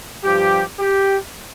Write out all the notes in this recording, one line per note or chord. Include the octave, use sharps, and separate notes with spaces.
G2 F3 G4
G4